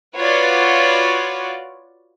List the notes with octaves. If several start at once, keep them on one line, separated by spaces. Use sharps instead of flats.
F4 F#4 B4 C#5 D5